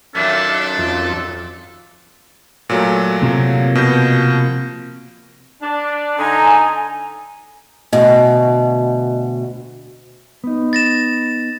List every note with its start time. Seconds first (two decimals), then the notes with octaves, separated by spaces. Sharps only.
0.15 F#2 A#2 D#3 D4 A4
0.78 F2
2.69 A#2 F#3 A3
3.23 C3 F3 A#3
3.75 B2 G6
5.62 D4
6.19 D3 D#4 G#5 A#5
7.93 D2 B2 D#5
10.44 B3 D#4
10.73 A6 A#6 E7